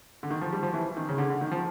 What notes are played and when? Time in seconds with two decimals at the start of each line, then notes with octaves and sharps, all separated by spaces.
0.23 D3
0.31 D#3
0.41 F3
0.52 G3
0.63 F3
0.74 E3
0.97 D#3
1.09 C#3
1.18 D3
1.30 D3
1.41 D#3
1.52 F3